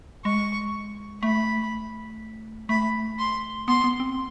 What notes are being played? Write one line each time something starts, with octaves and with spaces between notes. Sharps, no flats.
G#3 C#6
A3 B5
A3 B5
C6
B3 C6
B3
C4